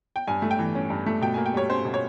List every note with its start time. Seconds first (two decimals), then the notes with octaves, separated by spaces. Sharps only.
0.16 G5
0.28 G2 G#5
0.42 A3
0.51 G5
0.59 E3
0.75 C#4
0.90 G2
1.06 A3
1.22 B2 G5
1.34 G#5
1.37 A#3
1.46 G5
1.54 G3 C#5
1.69 C#4 C5
1.85 B2
1.94 C#5